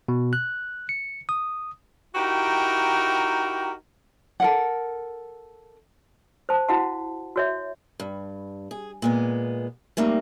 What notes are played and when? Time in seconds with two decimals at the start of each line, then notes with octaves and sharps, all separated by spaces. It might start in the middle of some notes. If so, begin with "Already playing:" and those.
0.08 B2
0.33 F#6
0.89 C#7
1.29 D#6
2.15 D#4 E4 F#4 G4 A#4 G5
4.40 A4 A#4 F#5
6.49 C5 A5
6.69 E4 F#4 F5 F#5 A5
7.36 F#4 C#5 E5
8.00 G2
8.71 G#4
9.02 A#2 G#3 B3
9.97 G3 A3 A#3 C4 D#4